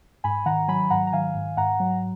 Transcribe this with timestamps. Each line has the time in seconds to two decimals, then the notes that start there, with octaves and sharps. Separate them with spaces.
0.24 G#2 G#5 B5
0.46 D#3 F#5 A#5
0.68 F#3 G#5 B5
0.90 G#2 F#5 A#5
1.07 A#5
1.13 D#3 F5 G#5
1.35 G#2
1.57 G#2 F#5 A#5
1.80 F#3